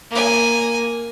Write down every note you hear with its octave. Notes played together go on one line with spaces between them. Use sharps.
A#3 G#5